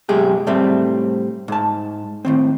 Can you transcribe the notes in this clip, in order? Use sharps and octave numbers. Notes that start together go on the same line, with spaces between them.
F#2 B2 G#3 G4 G#4
A2 G3 A3 C4
G#2 A5
A2 D#3 C4